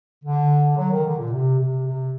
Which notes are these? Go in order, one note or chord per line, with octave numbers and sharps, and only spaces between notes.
D3
F#3
D#3
D3
A#2
C3
C3
C3